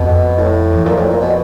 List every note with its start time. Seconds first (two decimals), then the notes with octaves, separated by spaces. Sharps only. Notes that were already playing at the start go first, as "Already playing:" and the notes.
Already playing: F2 B2
0.38 A2
0.72 E2
0.85 F2 A#2
0.97 A2
1.09 A#2
1.21 B2